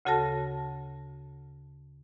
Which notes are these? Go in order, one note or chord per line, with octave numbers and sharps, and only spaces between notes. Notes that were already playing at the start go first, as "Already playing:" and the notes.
D2 C#3 F#4 A4 A5 A#6